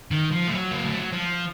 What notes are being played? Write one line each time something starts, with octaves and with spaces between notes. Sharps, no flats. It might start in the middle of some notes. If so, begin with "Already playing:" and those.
D#3
F3
A3
F#3
A#3
A3
F#3
F3